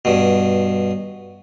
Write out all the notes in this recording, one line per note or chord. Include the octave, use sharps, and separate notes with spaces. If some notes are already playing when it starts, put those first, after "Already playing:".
G2 B2